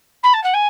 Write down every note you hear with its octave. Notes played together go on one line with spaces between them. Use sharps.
B5
A5
F#5
G#5